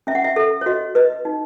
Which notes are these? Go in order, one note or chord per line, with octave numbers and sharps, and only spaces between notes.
C#4 E5
F#5
E5
A4 E5
C#5
F#4 D#5
B4 D#5
D#4